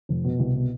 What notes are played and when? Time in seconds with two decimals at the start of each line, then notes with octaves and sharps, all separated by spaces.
0.09 F1
0.24 B2
0.39 C2
0.55 B2